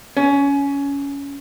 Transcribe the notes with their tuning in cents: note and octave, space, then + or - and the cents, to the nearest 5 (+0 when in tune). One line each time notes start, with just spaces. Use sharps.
C#4 +20